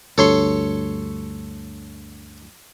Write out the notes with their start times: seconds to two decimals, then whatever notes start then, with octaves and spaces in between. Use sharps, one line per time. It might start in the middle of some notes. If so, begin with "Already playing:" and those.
0.18 D2 G2 A4 C#5 C6